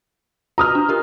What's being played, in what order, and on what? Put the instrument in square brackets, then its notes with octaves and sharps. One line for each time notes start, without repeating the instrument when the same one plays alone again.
[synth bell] F4 F#4 B4 [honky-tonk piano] A#5 D#6 F6
[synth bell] D4
F4 G4 A#4